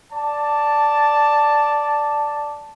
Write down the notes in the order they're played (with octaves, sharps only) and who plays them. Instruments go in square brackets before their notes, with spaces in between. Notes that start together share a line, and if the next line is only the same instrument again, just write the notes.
[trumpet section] D5 A5